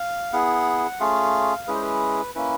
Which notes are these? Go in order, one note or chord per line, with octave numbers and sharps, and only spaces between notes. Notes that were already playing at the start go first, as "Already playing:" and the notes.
Already playing: F5
B3 E4 G#4 F#5
A3 C#4 F4 G#4 F5
G#3 C#4 E4 G#4 B4
C5
B4
A#3 C#4 E4 B4